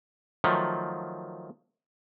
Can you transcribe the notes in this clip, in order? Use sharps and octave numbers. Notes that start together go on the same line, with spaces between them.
D#3 F3 F#3 A3